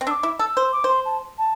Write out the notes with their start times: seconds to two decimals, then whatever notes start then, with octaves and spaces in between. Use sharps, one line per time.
0.01 C4
0.07 D4 E6
0.11 D6
0.23 E4
0.39 A4 E6
0.57 C5
0.73 D6
0.84 C5 C6
1.05 A5
1.38 A5